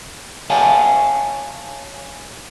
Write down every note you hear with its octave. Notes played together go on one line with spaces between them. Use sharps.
C#5 F5 G#5 A5